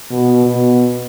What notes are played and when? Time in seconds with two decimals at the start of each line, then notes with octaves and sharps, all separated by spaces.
0.10 B2
0.46 B2